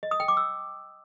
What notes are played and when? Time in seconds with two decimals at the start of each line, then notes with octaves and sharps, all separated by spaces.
0.03 D#5
0.11 D#6
0.20 G5
0.28 D6
0.37 E6